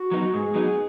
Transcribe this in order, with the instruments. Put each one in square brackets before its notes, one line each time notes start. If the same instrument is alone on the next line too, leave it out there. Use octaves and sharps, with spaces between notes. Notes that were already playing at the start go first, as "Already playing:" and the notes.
Already playing: [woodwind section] F#4
[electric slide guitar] F#3 B3 D#4
[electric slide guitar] G#2 [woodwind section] G#4
[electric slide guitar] F#3 B3 D#4 [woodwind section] G#4